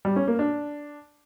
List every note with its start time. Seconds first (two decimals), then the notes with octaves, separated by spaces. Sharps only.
0.05 G3
0.16 C#4
0.28 A#3
0.39 D4